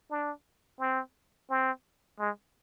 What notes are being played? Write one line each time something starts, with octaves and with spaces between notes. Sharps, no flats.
D4
C4
C4
G#3